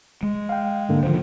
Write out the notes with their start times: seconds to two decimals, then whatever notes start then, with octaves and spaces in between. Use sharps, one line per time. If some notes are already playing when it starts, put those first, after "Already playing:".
0.23 G#3
0.49 F5 G5
0.89 G#2 D3 A#3
1.03 D3 D#3 F3 C5